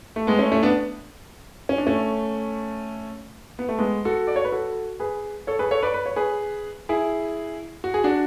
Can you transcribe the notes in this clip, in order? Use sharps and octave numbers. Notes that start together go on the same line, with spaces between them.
A3
G#3 B3
A3 C#4
A3 C#4
B3 D4
C#4
D4
A3 C#4
B3
A3
G#3 B3
F#4 A4
D5
C#5
B4
F#4 A4
G#4 B4
A4 C#5
G#4 B4
A4 C#5
B4 D5
B4
C#5
G#4 B4
E4 G#4
F#4
G#4
D4 F#4